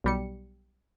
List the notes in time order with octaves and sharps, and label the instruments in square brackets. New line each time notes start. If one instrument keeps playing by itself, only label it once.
[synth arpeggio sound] B1 G3 C#7